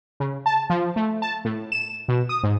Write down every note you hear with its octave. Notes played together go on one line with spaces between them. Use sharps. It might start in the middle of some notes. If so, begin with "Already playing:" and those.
C#3
A5
F3
A3
A5
A2
E7
B2
D#6
G#2